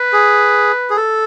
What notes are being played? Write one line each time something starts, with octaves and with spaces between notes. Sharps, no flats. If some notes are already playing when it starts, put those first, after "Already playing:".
Already playing: B4
G#4
G#4
A4